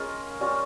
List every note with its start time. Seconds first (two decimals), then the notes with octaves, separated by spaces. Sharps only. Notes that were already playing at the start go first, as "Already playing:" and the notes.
Already playing: G#3 C#4 F4 G#4 A#4
0.40 G3 C#4 F4